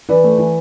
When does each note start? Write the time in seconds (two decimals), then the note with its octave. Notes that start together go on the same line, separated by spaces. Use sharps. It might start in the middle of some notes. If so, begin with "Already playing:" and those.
0.09 E3 B4 D5
0.24 A3
0.38 E3